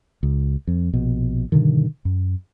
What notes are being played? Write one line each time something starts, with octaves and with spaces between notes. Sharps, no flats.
C#2
F2
A#1 B2
G2 B2 D3 D#3
F#2